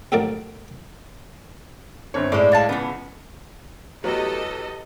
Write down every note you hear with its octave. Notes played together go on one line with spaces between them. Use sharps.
D#2 A2 D3 F3 A#4 D5
G1 C4 C#5
A2 G#3 C5 D5
C#5 F5 A5
C#2 E3 B3
E2 F#3 B3 G4 A4 D#5